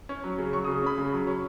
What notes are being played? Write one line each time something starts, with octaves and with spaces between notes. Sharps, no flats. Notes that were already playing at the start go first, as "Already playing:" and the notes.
C#4
F#3
C#3
F#3 C#6
D#6
C#3
D#6
C#4 B5
C#3
F#3
C#4